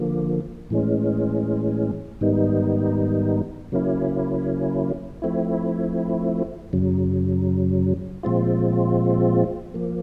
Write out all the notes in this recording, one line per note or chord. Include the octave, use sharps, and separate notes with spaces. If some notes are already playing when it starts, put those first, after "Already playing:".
Already playing: D3 F3 A#3
A2 E3 G#3 C#4
G#2 D#3 G3 B3 D#4
C#3 F#3 A#3 C#4 E4
F3 A3 C4 E4
F#2 C#3 F#3
A#2 F3 G#3 C4 F4
F3 A#3